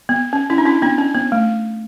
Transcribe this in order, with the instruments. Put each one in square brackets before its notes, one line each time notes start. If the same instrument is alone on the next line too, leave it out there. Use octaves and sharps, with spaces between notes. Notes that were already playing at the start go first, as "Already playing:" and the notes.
[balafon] B3
C#4
C#4 E4
D4
C#4 E4
B3 D4
C#4
B3
A3